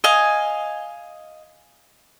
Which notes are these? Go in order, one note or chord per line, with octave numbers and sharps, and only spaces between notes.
D#5 F5 G#5